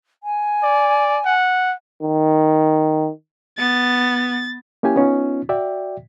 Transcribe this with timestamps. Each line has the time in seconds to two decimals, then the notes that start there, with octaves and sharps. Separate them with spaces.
0.23 G#5
0.63 D5
1.26 F#5
2.03 D#3
3.59 B3 A6
4.83 A#3 C#4 E4 G4 G#5
4.96 B3 C#4 D#4 F4
5.49 F#4 D5 E5 G5